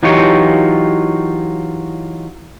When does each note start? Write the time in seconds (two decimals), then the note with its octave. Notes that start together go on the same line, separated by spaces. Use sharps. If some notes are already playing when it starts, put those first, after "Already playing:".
0.03 E3 F#3 D#4 F4 G4 C#5